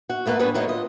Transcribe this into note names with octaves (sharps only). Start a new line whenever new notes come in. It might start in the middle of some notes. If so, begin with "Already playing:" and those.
F#4
E2 A3 A#3 B4 F#5
G3 B3 D4 G#4 B4 C#5
D#3 F#3 A3 A#3 C#4 D#4
F4 D#5